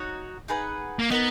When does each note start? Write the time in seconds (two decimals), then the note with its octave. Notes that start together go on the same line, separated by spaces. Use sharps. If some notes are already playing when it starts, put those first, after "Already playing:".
Already playing: D#4 F#4 C#5
0.48 D#4 G#4 B4 F#5
0.99 A#3
1.10 B3 D#4 A#4 D#5